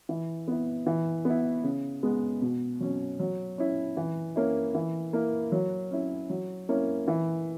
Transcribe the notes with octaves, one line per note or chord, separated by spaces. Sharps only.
E3
B3 E4
E3
B3 E4
C#3
G#3 B3
B2
F#3 C#4
F#3
C#4 E4
E3
A#3 C#4 E4
E3
A#3 E4
F#3
C#4 E4
F#3
A#3 C#4 E4
E3